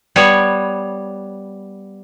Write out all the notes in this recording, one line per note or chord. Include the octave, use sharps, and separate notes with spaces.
G3 B3 C#5